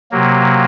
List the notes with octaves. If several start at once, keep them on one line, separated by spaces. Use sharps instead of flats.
C3 F#3 A#3